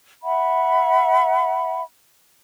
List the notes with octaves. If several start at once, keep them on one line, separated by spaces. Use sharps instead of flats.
E5 F#5 B5